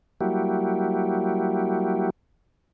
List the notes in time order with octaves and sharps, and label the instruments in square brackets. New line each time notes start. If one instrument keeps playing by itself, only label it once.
[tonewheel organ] F#3 G3 A#3 E4 F#4 G4